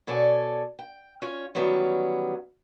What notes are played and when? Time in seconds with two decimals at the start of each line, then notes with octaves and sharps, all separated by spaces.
0.07 B2 A4 C#5 D5 G#5
0.79 G5
1.22 C#4 F4 C#5
1.55 D#3 E3 F#3 G3 B3 C#4